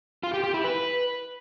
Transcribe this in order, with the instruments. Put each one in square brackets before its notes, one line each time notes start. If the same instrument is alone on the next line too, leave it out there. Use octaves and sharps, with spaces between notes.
[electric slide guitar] F4
G4
G4
E4
B4